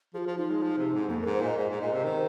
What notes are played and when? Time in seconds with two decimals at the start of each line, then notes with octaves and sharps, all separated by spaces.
0.14 F3 G#4
0.18 F4
0.27 F3
0.38 F3 D#4
0.50 G#3
0.62 F3
0.78 C3
0.93 G#2
1.09 F2 A#3
1.22 G#2 A#4
1.33 C5
1.41 A#2 D#5
1.57 G#2 C5
1.70 G#2
1.80 A#2 D#5
1.93 C3
2.04 D#3 C5